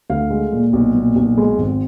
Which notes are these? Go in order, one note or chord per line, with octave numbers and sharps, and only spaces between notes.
D2 F5
G#3
A#2
B1
A#2
B1
G#3
G#1